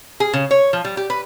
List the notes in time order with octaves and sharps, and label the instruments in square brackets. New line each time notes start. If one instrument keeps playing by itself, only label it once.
[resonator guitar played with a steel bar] G#4
C#3
C#5
F3
G3
G4
B4